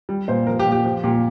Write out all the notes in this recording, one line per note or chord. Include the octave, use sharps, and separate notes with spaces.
G3
A#2 C5
F3 A#4
G4
A#2
G4
F3 G4
A#2 G4